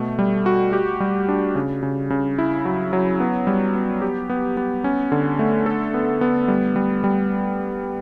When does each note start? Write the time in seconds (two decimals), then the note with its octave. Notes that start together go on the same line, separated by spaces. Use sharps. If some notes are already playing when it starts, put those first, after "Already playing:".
Already playing: B2 A3
0.19 G3
0.46 F#4
0.73 G4
1.00 G3
1.29 D4
1.55 C#3
1.83 C#3
2.10 C#3
2.38 E4
2.65 F#3
2.93 F#3
3.20 B3
3.47 G3
3.75 B3
4.02 G4
4.30 B3
4.57 B3
4.84 C#4
5.12 D3
5.39 A3
5.66 A4
5.94 B3
6.21 B3
6.48 G3
6.76 G3
7.04 G3